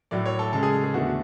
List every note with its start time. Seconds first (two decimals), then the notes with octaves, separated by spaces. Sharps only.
0.11 A2 F#3 A3 D5
0.26 C#5
0.39 A4
0.53 C#3 G#3 C#4 A4
0.63 G#4
0.84 G#4
0.94 E2 D3 A3 D4 F#4